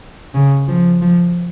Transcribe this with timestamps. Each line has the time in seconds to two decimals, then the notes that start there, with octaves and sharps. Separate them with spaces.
0.35 C#3
0.68 F3
1.01 F3